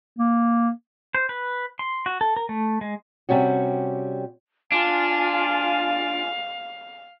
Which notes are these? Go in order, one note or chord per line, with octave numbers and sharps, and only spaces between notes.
A#3
C5
B4
C6
F#4
A4
A#4
A3
G#3
C3 G3 C#4 F#4
D4 F4 F5 G#5